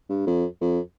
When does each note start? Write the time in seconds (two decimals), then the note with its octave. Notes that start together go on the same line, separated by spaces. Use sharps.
0.10 G2
0.27 F2
0.61 F2